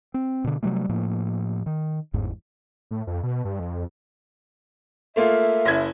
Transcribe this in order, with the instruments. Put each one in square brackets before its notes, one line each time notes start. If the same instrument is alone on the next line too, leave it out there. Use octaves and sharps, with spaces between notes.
[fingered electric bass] C4
B2 D3
C3 F#3 G3 A3
A2 F3 A#3
D#3
G1 E2 G#2
[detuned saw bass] A2
F2
B2
G2
F2
[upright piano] A3 A#3 F4 [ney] E5
[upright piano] F#1 E4 G#6